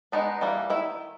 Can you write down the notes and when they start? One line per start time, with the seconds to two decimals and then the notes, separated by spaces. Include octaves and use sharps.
0.12 G#3 B3 D4 D#4
0.41 E3 G3 A#3
0.70 D#3 E4